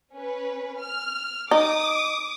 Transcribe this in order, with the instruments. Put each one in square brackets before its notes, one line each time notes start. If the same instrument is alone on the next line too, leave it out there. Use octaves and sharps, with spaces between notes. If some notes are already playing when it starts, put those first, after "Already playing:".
[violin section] C#4 B4
F6
[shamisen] D#4 [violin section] D6 D#6